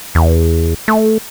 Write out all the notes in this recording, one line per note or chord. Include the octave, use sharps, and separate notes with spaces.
E2
A3